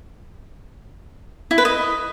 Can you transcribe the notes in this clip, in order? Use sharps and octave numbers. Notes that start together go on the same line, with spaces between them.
E4
B4
D#5